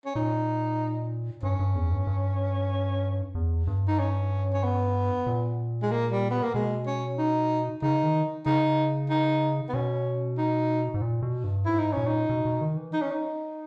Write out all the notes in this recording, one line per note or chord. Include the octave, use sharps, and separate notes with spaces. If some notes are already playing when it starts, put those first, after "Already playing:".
C#4
A#2 D#4
G2 C#4
G2
E2
G2
G2
E2
G2
D#4
C#4
C#4
B3
A#2
G#3
A#3
G3
B3
A#3
B2 G#3
C#4
D#4
C#3 D#4
D#3
C#3 D#4
D#4
B3
B2 C#4
D#4
G#2
A#2
B2
G2
G#2 E4
D#4
A#2 C#4
D#4
B2
B2
D#3
E3
D#4
C#4
D#4